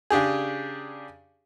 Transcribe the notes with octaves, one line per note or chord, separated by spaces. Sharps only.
C#3 D4 G4 G#4